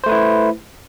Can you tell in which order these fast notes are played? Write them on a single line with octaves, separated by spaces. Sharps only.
C5 A3 B4 E4